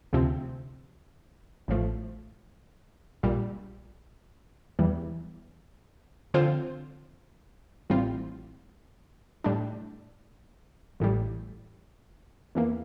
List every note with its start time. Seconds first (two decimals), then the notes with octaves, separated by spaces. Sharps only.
0.13 D2 C3 F3 C4
1.68 A1 A2 F3 A3
3.23 A#1 A#2 G3
4.79 E2 E3 G3
6.34 D3 F3 C4 F4 C5
7.90 A1 A2 G3 C4 F4
9.44 A2 G3 D4
11.00 A1 A2 G3
12.55 E2 E3 A#3